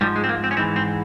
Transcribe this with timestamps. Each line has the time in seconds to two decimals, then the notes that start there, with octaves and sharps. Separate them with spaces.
0.01 G#2 F3 G3
0.16 G#3
0.24 C4
0.29 A#3
0.44 C4
0.51 C#4
0.57 G#2 E3 C4
0.76 C4